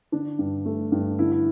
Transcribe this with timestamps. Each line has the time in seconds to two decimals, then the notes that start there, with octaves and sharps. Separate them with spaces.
0.12 D3 D4
0.39 G2
0.65 A3
0.92 G2
1.19 D3 E4
1.32 E4